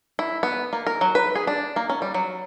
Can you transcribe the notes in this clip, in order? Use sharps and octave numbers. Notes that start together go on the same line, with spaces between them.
E4
B3
A#3
A#4
F#3
B4
G#4
D4
A#3
C#4
G3
F#3